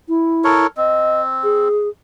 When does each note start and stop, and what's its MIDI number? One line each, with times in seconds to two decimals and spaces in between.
0.09 0.65 64
0.44 0.67 69
0.44 0.67 70
0.44 0.67 73
0.77 1.68 60
0.77 1.21 75
1.43 1.88 68